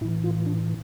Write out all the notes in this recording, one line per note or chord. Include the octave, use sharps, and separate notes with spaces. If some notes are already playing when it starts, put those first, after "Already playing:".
A2 E3 E4
F4
D4